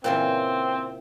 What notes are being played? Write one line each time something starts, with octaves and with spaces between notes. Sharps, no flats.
A#2 C#3 E3 C4